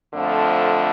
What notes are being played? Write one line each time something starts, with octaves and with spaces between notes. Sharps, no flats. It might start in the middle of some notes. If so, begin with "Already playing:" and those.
F2 D3 F3 A3